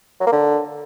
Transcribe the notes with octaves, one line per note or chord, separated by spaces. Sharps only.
F#3
A#3
D3